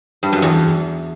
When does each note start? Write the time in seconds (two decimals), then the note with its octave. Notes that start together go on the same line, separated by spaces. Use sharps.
0.23 G2
0.33 F#2
0.42 E2